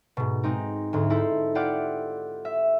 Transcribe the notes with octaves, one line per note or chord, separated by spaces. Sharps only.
G#2 B2
G#3 C4 D#4
D2 G#2
D#4 E4 A4 C5
E4 F4 G4 D5 F#5
E5